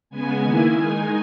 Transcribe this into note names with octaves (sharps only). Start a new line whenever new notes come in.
C#3 G#3 B3 G#5
D#3 A#3 E4 G#5
D#3 G#3 D#4